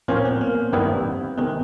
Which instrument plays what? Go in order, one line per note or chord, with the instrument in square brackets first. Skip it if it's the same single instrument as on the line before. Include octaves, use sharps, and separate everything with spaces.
[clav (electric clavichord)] A#2 F3 A#3 C#4 [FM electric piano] C4
[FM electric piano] B3
A#3
[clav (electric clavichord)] G2 D#3 G3 B3 E4 [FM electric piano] C4
[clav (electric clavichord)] C3 D#3 G#3 [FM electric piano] B3